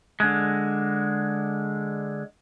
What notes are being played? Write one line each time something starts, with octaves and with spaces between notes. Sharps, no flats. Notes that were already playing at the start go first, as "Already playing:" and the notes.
D3 G#3